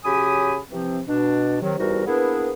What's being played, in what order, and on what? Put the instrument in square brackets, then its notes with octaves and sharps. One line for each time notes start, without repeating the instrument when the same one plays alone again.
[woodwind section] C#3 F#3 G4 G#5 B5 D#6
C3 E3 F3 C4
B2 D4
C3 D#3 F#3
E2 C3 G3 D#4 F#4 A#4
A#3 B3 D4 E4 G#4 B4